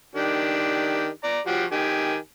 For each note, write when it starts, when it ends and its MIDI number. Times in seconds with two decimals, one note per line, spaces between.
0.16 1.07 51
0.16 1.07 62
0.16 1.07 67
1.24 1.39 74
1.24 1.39 82
1.47 1.63 53
1.47 1.63 66
1.47 1.63 67
1.72 2.15 51
1.72 2.15 67
1.72 2.15 80